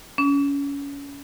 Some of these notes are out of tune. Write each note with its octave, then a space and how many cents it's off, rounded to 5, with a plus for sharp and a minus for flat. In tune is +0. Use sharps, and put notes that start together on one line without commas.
C#4 +25